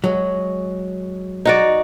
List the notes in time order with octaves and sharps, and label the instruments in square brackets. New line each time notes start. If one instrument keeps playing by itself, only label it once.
[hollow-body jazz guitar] F#3 G#3
[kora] D#4 F#4 D5